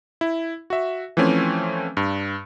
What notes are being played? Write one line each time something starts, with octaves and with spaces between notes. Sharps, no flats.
E4
F#4 E5
E3 F3 A3 C4 C#4
G2